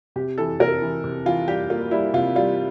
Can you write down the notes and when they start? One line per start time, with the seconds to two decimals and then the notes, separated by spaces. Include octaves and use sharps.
0.16 C3 G4
0.38 E3 A4
0.60 C3 A#4
0.82 E3
1.04 C3
1.26 E3 F4
1.48 G3 G4
1.70 A#3 F4
1.91 G3 E4
2.13 C3 F4
2.36 G3 F4